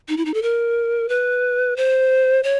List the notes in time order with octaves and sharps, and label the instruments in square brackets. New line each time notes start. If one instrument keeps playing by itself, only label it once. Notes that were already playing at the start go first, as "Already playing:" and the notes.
[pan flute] D#4
E4
D#4
A4
A#4
B4
C5
C#5